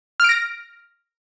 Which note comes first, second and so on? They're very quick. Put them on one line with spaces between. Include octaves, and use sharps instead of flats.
F6 D7 A#6